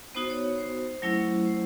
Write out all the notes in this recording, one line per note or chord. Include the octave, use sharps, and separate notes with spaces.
B3 D#4 F#4 C5
C#5
C5
F#3 A3 C#4 E4
C5